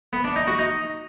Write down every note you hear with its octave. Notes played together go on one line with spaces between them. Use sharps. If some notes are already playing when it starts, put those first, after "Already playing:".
B3
D4
D#4
F#4
D#4